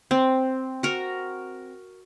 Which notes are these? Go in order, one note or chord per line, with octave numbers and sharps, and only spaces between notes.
C4
F#4 A#4